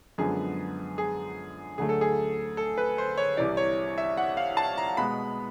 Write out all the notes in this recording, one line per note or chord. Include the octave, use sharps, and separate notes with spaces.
F#2 D3 F3 G#3 B3 G#4
G#4
D2 D3 F#3 A3 G#4
A4
G#4
A4
B4
C5
C#5
C2 C3 E3 D5
C#5
E5
F#5
F5
A5
A#5
B2 G#3 B3 B5